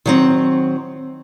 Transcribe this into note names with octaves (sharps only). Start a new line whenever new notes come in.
D#3 F#3 C4